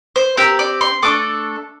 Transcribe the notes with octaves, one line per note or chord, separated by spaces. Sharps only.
C5
C4 G4 A#4
D5
C6
A3 D4 A4 D6